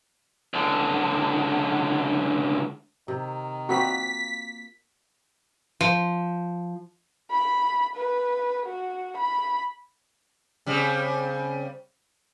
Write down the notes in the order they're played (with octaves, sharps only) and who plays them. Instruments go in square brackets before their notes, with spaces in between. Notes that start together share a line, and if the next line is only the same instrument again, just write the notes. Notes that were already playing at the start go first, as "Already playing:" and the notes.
[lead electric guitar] C#2 D3
[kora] C3 [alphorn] D#3
[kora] A#3 F4 B4 [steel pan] C4 F#4 [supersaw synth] B6
[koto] F3
[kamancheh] B5
B4
F#4
B5
[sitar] C#3 G3 C4